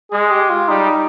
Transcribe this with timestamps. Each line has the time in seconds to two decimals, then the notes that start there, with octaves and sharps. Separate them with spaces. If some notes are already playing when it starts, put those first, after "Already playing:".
0.12 G#3 G#4
0.31 G4
0.50 F4
0.68 G3 D#4